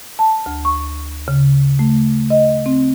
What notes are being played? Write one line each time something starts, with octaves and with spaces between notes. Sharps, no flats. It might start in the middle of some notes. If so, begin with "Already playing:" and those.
A5
D2
C#6
C#3
A3
D#5
C4